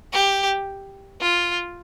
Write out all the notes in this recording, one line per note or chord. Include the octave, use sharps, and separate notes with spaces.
G4
F4